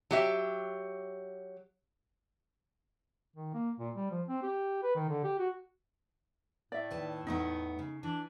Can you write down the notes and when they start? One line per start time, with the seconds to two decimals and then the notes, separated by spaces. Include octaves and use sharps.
0.11 F#3 G4 E5
3.36 D#3
3.54 A#3
3.79 A#2
3.95 G3
4.10 F3
4.28 C4
4.42 G4
4.83 B4
4.95 D#3
5.09 D3
5.24 G4
5.39 F#4
6.72 A2 D5 E5
6.91 D#2 B4 A5
7.27 E2 A3 B3 D#4
7.79 C#3
8.03 E3 D4